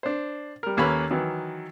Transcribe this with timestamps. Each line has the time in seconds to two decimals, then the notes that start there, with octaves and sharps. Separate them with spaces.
0.03 D4 C5
0.63 G3 A#4
0.77 D#2 A#3 C#4 A4 B4 B5
1.11 D#3 E3 F#3